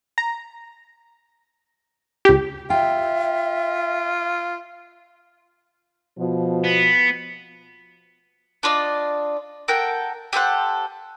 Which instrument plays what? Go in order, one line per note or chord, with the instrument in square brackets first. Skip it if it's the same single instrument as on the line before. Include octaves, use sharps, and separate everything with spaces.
[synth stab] A#5
C#2 G4
[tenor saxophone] F4 [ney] E5 [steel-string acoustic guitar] G5
[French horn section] B2 F3
[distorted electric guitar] B3
[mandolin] D4 F4 D5 D#5
A4 A#4 F#5 G5
G4 A4 C5 F#5